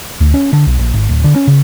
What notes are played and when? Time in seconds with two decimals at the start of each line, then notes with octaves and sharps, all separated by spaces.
0.21 D2
0.34 C#4
0.53 D3
0.67 B1
0.79 A#1
0.94 G#1
1.09 D1
1.24 D3
1.36 C#4
1.48 C#3